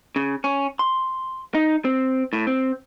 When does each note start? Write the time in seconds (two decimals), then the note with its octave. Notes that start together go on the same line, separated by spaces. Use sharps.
0.16 C#3
0.44 C#4
0.79 C6
1.54 D#4
1.85 C4
2.33 A2
2.47 C4